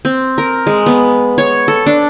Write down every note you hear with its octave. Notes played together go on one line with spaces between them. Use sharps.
C4
A#4
G#3
B3
C#5
A4
D4